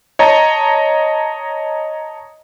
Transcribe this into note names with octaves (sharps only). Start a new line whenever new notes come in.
C#5 D#5 A5 A#5